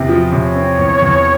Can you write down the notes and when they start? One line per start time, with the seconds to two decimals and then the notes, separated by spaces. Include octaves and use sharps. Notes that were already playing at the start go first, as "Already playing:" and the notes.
Already playing: E2 C3 C4
0.09 F3
0.32 C3 C#5
0.56 C4
0.79 E2
1.02 E2